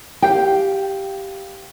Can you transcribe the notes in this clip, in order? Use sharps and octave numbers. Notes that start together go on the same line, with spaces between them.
G4 F5 G5